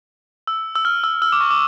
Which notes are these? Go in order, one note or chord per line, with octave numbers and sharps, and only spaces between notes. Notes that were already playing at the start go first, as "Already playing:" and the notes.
E6
E6
F6
E6
E6
D6
C#6
D6